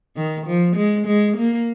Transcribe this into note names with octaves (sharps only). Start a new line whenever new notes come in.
D#3
F3
G#3
G#3
A#3